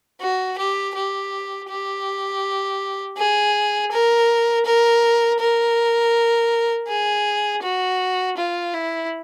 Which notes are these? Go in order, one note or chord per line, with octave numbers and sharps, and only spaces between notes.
F#4
G4
G4
G4
G#4
A#4
A#4
A#4
G#4
F#4
F4
E4